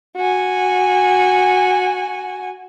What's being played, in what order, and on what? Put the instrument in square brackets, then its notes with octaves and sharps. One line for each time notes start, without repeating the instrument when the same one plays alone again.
[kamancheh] F#4 G#5